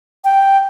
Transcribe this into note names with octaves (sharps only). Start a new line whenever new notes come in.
G5